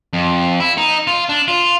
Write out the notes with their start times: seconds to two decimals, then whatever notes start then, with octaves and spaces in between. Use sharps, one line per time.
0.13 F2
0.60 E4
0.77 D#4
1.07 F4
1.29 D4
1.48 F4